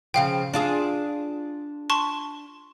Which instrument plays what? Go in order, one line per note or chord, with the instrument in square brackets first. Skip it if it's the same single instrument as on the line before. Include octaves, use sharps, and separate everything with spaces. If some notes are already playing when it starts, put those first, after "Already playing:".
[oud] C#3 F3 [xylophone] F5 G5
[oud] D4 F4 G#4
[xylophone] A5 C6 C#6